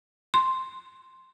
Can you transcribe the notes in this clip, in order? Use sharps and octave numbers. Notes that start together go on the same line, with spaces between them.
C6